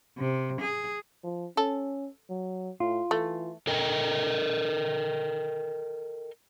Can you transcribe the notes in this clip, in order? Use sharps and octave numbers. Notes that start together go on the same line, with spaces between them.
C3
G#4
F3
C#4 A4
F#3
A2 F4
E3 A3
A4 A#4 D#5 G5